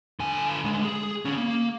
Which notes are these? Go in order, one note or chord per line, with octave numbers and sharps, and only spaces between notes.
D3 G#5
D2 G#3
G#4
D3 C#4
A#3